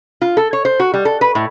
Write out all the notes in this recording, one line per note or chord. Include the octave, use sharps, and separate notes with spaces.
F4
A4
C#5
C5
F#4
G3
A4
B4
A2